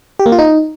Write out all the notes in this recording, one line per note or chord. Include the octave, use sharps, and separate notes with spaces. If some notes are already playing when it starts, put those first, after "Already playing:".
G4
A#3
F4
D#4